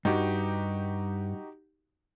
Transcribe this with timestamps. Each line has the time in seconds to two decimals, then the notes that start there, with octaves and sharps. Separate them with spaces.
0.05 G2 D#4 F#4 G4